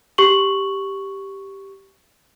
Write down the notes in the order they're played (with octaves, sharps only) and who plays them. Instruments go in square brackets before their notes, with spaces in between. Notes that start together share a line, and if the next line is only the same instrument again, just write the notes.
[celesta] G4 C#6 F#7